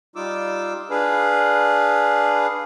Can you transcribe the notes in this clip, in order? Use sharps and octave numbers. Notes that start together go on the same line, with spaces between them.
G3 D#4 F4 D6 E6
D4 G#4 B4 F5